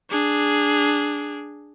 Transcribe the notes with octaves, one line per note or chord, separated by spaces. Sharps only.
D4 G#4